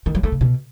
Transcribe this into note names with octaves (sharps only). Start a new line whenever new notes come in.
D#3
F#3
A3
C#3
B2